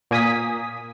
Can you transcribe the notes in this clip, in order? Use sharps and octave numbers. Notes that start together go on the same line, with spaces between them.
A#2 A#3 G#5 D#6 B6